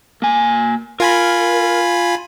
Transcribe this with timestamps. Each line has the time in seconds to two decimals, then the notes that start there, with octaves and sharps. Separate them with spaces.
0.22 A#3 G#5
1.00 F4 A#4 G#5 B5